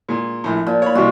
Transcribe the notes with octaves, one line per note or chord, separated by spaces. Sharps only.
A#2 G#3
A#1 A2
A#2 F3
C#5 B5
C3 E3 G3 G#3 F#4